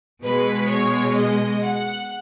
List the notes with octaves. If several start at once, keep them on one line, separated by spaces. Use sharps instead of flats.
B2 G#3 B4
C#5
D#5
F#5